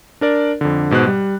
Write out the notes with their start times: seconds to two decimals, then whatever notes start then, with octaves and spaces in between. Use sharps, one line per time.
0.21 D4 A#4 D5
0.61 F2 D3
0.91 G#2 B2 C5 F#6
1.07 G3